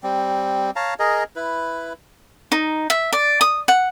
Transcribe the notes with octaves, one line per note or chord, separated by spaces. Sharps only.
G3 C4
C#5 F5 A5 A#5
G#4 A#4 D#5
E4 B4
D#4
E5
D5
D#6
F#5